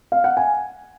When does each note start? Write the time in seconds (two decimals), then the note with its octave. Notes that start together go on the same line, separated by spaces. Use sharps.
0.12 F5
0.24 F#5
0.37 G#5